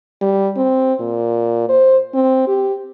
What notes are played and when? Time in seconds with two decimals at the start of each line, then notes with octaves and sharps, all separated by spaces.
0.21 G3
0.56 C4
1.00 A#2
1.69 C5
2.14 C4
2.47 G4